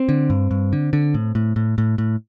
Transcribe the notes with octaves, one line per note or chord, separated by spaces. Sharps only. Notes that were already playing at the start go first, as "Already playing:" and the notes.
Already playing: C4
D3
G2
G2
D3
D3
A2
A2
A2
A2
A2